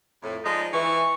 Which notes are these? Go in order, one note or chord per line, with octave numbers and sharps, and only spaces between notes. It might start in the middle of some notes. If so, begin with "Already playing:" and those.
F2 A2
F3 G#3 D#4 D5
E3 C#6